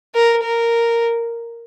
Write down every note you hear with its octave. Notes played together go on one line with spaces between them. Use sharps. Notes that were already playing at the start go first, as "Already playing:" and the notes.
A#4
A#4